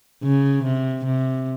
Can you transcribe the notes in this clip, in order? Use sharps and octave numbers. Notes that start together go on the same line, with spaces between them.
C#3
C3
C3